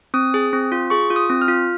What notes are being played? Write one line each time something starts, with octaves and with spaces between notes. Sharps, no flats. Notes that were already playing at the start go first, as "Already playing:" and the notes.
C4 D#6
G#4
C4
F4
G#4 C#6
F4
D#6
C4
F6
F4